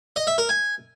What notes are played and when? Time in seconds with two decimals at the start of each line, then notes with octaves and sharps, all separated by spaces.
0.16 D#5
0.27 E5
0.38 A#4
0.49 G#5